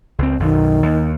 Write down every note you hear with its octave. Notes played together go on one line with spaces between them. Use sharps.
C#2 C4
B1 F#2 B2 D#3
D#2